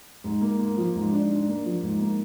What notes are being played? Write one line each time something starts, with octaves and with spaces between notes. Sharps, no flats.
G#2
A#3
A#3
F3
G#2
D4
D4
A#3
F3
G#2
A#3